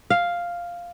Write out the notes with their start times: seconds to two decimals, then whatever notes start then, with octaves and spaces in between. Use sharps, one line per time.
0.10 F5